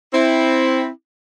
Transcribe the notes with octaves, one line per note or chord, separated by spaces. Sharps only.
C4 E4